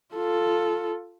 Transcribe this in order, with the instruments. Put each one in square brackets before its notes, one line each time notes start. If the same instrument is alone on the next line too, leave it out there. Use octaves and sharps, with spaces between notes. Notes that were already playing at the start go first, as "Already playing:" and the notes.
[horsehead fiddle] F4 A4